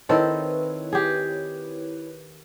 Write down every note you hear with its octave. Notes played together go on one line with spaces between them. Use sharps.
D#3 C4 E4 A4 B4 C#5
G4 G#4